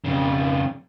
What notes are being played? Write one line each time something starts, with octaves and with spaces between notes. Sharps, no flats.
F2 C#3